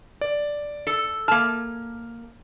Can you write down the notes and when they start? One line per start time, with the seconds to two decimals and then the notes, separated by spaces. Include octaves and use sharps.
0.21 D5
0.87 A4
1.28 A#3 A5 F6